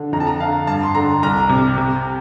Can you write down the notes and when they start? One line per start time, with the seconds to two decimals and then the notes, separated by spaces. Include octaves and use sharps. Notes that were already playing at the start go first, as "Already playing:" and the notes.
Already playing: D3
0.13 F2 A#5
0.20 A5
0.27 A#5
0.40 D3 F5
0.67 G2 A5
0.83 C6
0.95 D3 A#5
1.22 C2 A#5
1.49 C3
1.78 C3